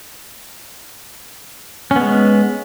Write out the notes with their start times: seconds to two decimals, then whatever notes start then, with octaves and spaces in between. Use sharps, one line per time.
1.91 C#4
1.96 B3
2.01 G#3